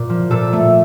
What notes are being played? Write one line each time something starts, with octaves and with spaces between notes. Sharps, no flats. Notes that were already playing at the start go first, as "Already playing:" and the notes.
Already playing: A#2
F3
A#2 A4
A3